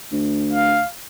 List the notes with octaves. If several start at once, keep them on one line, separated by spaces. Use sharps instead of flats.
D2
F5